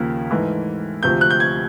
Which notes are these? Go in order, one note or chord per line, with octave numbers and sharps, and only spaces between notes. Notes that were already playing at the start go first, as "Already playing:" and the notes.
Already playing: D#2 C#3 F3 A#3
G#2 E3 A3
D2 C3 F3 G6
F#6
G6
G#6